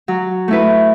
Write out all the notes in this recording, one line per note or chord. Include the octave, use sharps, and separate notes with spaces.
F#3
A3 E4 B4